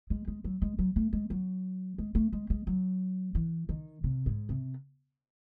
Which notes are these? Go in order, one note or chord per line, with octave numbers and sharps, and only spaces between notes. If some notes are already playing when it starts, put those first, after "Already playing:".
G#3
G#3
F#3
G#3
F#3
A3
G#3
F#3
G#3
A3
G#3
G#3
F#3
E3
D#3
C3
G#2
C3